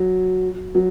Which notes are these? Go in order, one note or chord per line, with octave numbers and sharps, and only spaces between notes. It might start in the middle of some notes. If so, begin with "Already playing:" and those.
Already playing: F#3
F#3